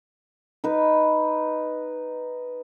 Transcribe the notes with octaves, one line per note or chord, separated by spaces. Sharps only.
D#4 B4